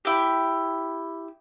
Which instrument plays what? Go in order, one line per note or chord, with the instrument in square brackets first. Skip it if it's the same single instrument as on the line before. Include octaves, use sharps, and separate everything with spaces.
[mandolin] E4 G4